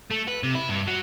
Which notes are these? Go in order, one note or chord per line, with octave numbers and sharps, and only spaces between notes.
A3
B4
C3
E4
G2
F#3